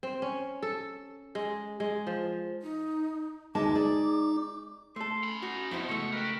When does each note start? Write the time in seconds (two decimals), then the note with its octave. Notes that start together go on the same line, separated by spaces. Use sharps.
0.03 C4
0.22 C#4
0.63 A4
1.35 G#3
1.80 G#3
2.07 F3
2.62 D#4
3.55 D2 G#3 D#4 A5 D6
3.75 G#4 D5
4.96 A3 A4 C6
5.23 C#4 B5
5.42 D#4 F#4
5.71 F2 B2 E4 C5
5.89 C#2 A3 C#6
6.12 A#4 B4 G5